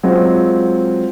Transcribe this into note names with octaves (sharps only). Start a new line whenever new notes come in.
F#3 G#3 C4 F4